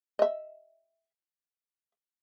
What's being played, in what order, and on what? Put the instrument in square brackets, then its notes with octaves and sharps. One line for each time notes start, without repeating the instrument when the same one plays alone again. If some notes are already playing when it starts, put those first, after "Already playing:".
[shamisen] D#5 E5